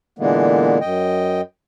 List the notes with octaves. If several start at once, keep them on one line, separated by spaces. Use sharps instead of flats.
A#2 D3 E3 G#3 A#3 B3
F#2 D#5 G5